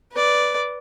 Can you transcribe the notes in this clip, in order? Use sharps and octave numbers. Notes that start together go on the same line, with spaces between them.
B4 D5